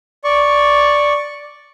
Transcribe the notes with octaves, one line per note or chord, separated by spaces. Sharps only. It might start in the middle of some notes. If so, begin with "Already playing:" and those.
D5 C#6